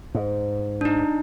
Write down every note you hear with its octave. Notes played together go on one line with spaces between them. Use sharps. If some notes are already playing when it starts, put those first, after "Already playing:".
G#2
D4 D#4